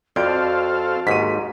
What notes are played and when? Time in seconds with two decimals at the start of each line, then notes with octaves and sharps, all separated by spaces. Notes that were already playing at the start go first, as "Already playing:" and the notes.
0.16 F2 F#4 A4 C5 D5 F5 G6 D7
1.07 D#2 G#2 B6 D#7